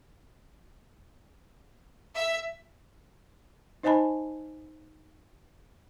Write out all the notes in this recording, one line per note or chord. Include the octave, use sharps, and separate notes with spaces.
E5
D#4 C5 D#5 G#5 A5 B5